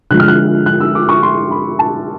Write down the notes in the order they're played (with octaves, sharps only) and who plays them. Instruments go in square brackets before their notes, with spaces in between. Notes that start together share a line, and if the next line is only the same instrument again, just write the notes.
[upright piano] D3 F3 G#3 F#6
F6
F#6
F#6
E6
D6
C#6
C6
B5
A5